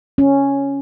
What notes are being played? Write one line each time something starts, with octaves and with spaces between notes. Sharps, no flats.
C#4